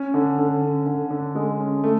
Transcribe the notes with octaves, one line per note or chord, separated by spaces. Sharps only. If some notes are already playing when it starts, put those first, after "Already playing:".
Already playing: C#4
D3
D3
C#4
D3
D3
G#3
C#4
A3